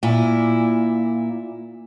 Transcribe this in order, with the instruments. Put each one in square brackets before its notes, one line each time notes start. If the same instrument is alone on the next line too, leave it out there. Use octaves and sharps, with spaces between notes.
[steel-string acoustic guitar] A#2 E4